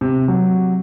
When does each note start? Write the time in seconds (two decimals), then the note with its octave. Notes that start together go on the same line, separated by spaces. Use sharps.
0.01 C3
0.28 F#3